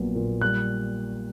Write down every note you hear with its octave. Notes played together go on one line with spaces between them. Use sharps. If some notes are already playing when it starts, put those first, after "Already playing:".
Already playing: A#1 A#2 F#3 B3
A#2
G3 F#6